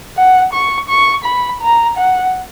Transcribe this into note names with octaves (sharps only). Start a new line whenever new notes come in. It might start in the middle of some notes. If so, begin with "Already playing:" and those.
F#5
C#6
C#6
B5
A#5
F#5